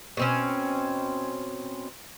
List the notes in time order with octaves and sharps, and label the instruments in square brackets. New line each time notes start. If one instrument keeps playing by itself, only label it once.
[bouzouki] B2 C4 C#4